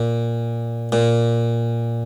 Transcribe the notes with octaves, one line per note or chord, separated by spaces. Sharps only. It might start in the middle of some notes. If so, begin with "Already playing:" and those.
Already playing: A#2
A#2